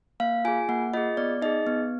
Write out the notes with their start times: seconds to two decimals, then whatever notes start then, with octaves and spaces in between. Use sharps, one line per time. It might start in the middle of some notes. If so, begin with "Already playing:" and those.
0.20 A#3 F5
0.45 F4 G#5
0.48 G#4
0.69 A#3 F#5
0.94 F4 G#4 D#5
1.17 B3 D5
1.42 D#4 G#4 D#5
1.67 B3